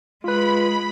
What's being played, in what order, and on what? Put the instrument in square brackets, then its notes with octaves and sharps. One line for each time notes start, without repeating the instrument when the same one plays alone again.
[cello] G#3 [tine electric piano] F4 B4 [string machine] B5